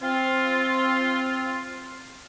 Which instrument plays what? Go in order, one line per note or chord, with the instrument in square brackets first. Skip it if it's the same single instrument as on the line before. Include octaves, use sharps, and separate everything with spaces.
[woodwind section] C4 F4